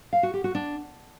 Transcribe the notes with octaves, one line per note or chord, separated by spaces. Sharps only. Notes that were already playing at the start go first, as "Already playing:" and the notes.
F5
F#4
G4
F#4
D4